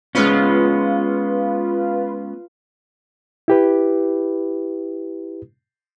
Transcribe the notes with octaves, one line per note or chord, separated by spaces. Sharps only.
G#3 B3 C#4 F4 B4
E4 G4 B4